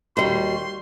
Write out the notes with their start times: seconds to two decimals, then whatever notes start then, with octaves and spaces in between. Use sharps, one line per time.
0.17 D#2 G3 F#4 C6